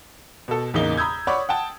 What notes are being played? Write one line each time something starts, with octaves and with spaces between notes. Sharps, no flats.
B2 A4
A1 E2 C#3 A#3 D#4 G7
A#5 B5 D#6 E6 G6 G#6
C#5 D5 F#5 B5 C#6
F#5 G5 A5